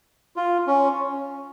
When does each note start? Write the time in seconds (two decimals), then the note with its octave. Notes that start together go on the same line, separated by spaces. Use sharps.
0.36 F4
0.67 C#4